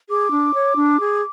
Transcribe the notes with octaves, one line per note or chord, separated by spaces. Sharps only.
G#4 D6
D4
C#5
D4
G#4